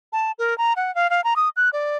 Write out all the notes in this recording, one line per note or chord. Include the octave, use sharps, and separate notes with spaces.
A5
A#4
A#5
F#5
F5
F5
A#5
D#6
F#6
D5